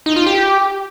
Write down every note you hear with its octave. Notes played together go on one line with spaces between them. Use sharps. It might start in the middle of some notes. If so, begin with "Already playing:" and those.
D#4
F4
G4